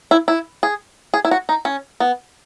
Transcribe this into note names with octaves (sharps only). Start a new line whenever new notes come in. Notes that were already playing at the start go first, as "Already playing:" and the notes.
E4
E4
G#4
G#4
E4
F#4
D#4
C#4
B3